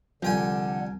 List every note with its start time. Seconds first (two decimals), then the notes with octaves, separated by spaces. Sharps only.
0.23 C2 D3 F3 G5 G#5